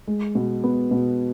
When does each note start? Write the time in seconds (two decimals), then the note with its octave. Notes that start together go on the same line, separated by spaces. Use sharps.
0.08 G#3
0.35 B2
0.64 B3
0.91 B2